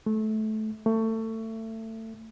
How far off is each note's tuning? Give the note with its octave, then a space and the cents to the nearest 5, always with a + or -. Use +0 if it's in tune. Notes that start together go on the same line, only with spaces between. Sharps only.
A3 -20
A3 +25